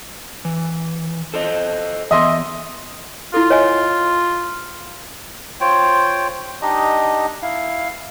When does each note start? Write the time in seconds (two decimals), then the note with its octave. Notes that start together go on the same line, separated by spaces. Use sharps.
0.45 E3
1.34 A4 C5 D#5
2.11 E3 B3 D#5 E5 C6
3.34 E4 F4 A4
3.50 C#5 D#5 G#5
5.61 F4 C5 C#5 G5
6.62 D4 D#4 G4 D#5
7.42 E4 F5